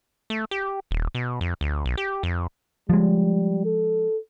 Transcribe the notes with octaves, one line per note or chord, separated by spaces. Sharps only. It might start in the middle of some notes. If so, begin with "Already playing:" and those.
A3
G4
D#1
B2
F2
D2
B1
G4
F2
F3 G3 G#3
A4